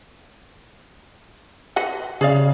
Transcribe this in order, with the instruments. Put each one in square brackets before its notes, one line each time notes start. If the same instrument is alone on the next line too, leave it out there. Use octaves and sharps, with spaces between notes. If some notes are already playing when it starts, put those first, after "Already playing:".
[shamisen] B4 D#5 F#5
[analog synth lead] C#3 [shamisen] G#4 D5 F5